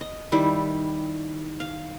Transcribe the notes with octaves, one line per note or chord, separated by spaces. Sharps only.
D#5
D#3 G3 E4
F5